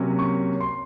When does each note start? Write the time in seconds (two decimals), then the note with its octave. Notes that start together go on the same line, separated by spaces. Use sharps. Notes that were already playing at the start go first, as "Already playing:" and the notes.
Already playing: C3 F#3 A#3 C#4
0.19 C#6
0.61 C6